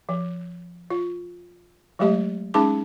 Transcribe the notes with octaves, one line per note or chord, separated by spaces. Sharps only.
F3
F4
F#3 G#3 A3 G4 D#5
G#3 C#4 D#4 G#4 A5 D6